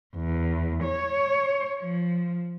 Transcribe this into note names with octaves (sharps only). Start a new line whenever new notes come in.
E2
C#5
F3